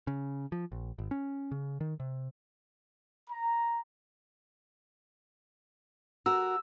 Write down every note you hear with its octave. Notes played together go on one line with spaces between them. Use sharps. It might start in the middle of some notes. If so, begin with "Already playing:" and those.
C#3
F3
A#1
G#1
C#4
C#3
D#3
C3
A#5
F#4 A#4 E6